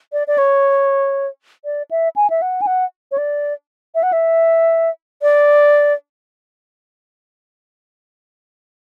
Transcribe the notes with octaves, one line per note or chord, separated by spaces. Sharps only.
D5
D5
C#5
D5
E5
G#5
E5
F#5
G#5
F#5
C#5
D5
E5
F#5
E5
D5